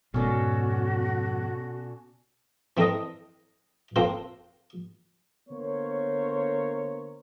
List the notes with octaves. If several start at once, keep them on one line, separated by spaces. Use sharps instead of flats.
F2 G#2 B2 C#4 F#4 A4 D5
E3 C4 A4 A#4 D#5
A#3 C4 F4 A4 A#4 C5
D3 A#3 B3 A#4 C5 C#5